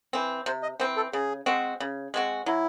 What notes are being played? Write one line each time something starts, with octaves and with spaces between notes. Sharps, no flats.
E3 C4
C3 C5
D#5
E3 C4 C5
A4
C#3 G#4
G#3 C4 F#4
C#3
G#3 C4 F#4
F#3 E4